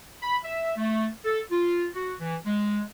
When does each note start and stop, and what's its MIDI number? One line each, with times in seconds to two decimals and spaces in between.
0.22 0.36 83
0.44 0.72 76
0.77 1.08 57
1.25 1.41 69
1.51 1.87 65
1.94 2.14 66
2.20 2.36 52
2.46 2.81 56